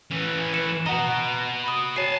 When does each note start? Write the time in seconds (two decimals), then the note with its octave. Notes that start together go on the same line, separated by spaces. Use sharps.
0.11 E3 C#4
0.53 B4 C#7 E7
0.86 F#4 D#5 F#5 A#5
1.64 B5 D#6
1.96 C#5 G#5 A5 C7